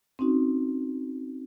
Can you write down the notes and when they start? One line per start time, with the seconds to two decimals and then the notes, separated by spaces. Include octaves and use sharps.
0.19 C4 C#4 D#4 F#4